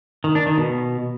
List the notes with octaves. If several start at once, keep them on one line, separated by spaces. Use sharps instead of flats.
D#3
D4
D#3
B2